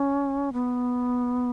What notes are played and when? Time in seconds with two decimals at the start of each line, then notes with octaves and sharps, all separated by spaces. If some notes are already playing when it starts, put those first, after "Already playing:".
Already playing: C#4
0.53 B3